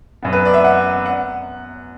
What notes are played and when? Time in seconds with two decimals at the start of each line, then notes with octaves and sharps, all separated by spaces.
0.23 F#2 F#3 B3
0.33 B4
0.45 D5
0.54 E5
0.64 F#5
1.06 F#5